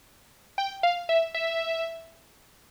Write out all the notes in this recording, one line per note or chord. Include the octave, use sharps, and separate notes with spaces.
G5
F5
E5
E5